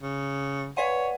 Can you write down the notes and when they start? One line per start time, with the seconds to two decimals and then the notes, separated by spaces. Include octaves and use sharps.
0.02 C#3
0.77 B4 C#5 D5 F#5